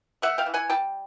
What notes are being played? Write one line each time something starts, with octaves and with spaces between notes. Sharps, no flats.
A3 E5 F#5
F5 G5
E3
F#5 G#5
G3 G5 A5